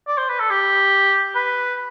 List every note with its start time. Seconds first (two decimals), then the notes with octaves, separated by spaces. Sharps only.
0.07 D5
0.18 C5
0.29 B4
0.40 A4
0.50 G4
1.35 B4